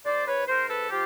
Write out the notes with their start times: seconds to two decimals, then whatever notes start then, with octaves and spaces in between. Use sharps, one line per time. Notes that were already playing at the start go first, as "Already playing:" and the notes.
0.04 G#2 C5 D5
0.26 B4 C#5
0.47 G#2 A#4 C5
0.69 A4 B4
0.90 F3 F4 G4